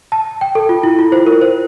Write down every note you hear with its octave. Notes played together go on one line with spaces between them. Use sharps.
A5
G5
A4
F4
E4
F4
C5
A#4
C5